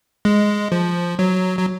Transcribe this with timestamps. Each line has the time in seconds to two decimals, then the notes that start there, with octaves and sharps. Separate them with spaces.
0.25 G#3
0.72 F3
1.19 F#3
1.59 F#3